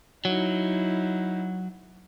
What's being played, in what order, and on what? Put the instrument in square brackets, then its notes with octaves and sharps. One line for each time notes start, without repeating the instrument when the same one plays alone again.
[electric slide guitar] F#3 [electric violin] D#4 E4